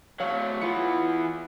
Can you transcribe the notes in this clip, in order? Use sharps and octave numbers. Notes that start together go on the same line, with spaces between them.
F#3 A3 C#5 F5
E3 B3 F4 C#7